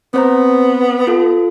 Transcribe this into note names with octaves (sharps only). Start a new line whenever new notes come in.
B3 C4 C5 A#5
F4 A4